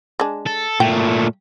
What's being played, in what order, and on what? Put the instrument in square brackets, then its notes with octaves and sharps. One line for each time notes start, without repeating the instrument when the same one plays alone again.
[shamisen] G#3 D4
[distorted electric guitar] A4
[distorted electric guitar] A#2 A3 [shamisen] G5